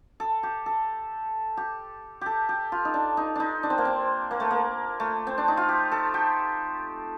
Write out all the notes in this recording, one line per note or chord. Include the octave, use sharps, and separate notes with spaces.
A4
G4
A4
G4
G4 A4
G4
F4
D#4
D4
D#4
D4 D#4
D4
C4
A#3
C4
A#3
A3
A#3
A3
C4
D4
D#4
F4
G4
A4
G4